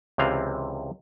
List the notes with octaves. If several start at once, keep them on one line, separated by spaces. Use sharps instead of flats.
C#2 C3 E3 F5